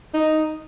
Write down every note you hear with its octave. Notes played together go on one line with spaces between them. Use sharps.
D#4